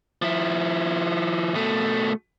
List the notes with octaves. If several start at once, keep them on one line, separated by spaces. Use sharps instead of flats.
F3 E4
B2 A3